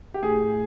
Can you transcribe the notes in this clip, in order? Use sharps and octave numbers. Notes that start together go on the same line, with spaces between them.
G4
A2 G#4